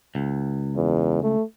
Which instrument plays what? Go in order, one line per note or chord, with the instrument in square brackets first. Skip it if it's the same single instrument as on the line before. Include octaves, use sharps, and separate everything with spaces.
[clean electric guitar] C#2
[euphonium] E2
A3